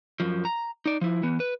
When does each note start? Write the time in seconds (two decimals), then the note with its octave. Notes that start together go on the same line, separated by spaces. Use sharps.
0.20 F#2 F3
0.45 A#5
0.86 D#4 D5
1.01 F3 E4
1.23 E3 B3
1.40 B4